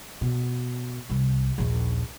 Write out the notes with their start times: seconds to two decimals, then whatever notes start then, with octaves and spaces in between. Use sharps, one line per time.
0.21 B2
1.10 C2
1.58 A#1 D#2